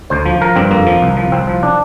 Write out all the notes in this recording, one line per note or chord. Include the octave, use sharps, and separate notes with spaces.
D2 C5
F3
F3 A#4
G2 C4
F2 A#3
F3
C2
F3
C2 C4
F3
D4